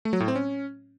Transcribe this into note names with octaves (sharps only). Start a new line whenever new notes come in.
A3
F#3
A2
C4
C#4